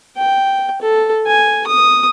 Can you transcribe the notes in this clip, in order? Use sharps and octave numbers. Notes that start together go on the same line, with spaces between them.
G5
A4
G#5
D#6